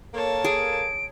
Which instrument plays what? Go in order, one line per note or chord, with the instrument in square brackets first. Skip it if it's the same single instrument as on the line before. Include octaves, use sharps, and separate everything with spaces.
[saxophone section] A#3 A4 [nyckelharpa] C#5 A5
[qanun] G#4 [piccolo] D7